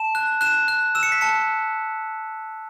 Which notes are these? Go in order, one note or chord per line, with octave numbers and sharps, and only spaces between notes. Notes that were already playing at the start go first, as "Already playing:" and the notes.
Already playing: A5 E7
F#6
F#6 E7
F#6
E6 E7
C#7
B6
A5 C#7